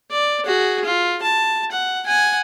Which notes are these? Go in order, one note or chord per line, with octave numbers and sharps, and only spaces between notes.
D5
F#4 G#4
F4
A5
F#5
F#5 G#5